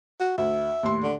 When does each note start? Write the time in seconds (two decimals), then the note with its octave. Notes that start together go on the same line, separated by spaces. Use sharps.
0.20 F#4
0.38 D2 E5
0.83 D#2 A2 C6
1.03 D3